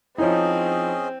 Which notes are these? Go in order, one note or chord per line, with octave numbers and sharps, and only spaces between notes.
F3 C4 C#4 D#4 E4 G#4 C#5 D#5